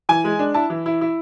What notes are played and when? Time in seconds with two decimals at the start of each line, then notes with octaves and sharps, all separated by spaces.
0.09 E3 G#5
0.24 G#3
0.39 D4
0.54 E4 A5
0.70 E3
0.86 E4
1.01 E4